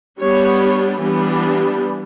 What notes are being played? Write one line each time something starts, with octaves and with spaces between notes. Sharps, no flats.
G3 B3 D4 C#5
E3 G3 B3 D4